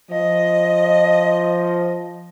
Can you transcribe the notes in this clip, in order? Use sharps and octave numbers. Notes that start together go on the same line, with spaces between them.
F3 D#5